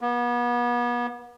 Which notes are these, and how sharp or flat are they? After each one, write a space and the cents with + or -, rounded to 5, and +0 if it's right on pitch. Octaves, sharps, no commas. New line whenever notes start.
B3 -35